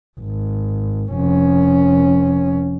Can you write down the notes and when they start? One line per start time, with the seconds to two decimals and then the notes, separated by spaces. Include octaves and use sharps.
0.19 G#1
1.12 F1 C#4